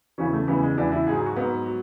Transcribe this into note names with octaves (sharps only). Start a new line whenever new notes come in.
E2 C#3 E3 C#4
A3
E2 C#3 E3 B3
G#3
E2 C#3 E3 D4
E4
G#2 F#3 G#4
G#4
F#4
G#2 F#3 B3
F#3